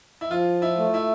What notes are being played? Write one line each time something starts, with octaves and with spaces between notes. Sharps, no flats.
E4
F3 F4
E4
A3
E4